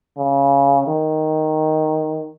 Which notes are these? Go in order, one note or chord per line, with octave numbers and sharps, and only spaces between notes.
C#3
D#3